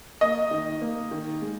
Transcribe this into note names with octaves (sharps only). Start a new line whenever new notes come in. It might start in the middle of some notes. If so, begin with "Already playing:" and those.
A#3 D#5
D#3
A#3
D#3
G#3